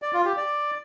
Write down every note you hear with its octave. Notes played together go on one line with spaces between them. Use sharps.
D5
F4
G4
D5